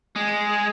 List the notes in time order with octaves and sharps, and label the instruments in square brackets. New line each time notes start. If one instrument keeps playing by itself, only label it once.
[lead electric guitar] G#3